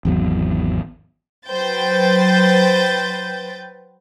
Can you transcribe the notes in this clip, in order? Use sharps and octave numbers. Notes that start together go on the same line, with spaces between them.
G#1 E2 F#3 B3
F#3 B4 C5 G5 G6 A6